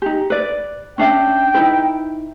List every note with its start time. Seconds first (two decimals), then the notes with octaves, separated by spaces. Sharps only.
0.02 D#4 G4
0.30 B4 D5
0.98 C#4 D4 E5 G5
1.54 D#4 E4 B4